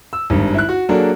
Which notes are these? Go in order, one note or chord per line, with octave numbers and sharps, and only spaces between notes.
E6
G#1 G2
E4 F#6
F#4
F#3 A#3 D4 G#4 A4